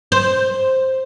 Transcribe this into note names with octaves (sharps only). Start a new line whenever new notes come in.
C5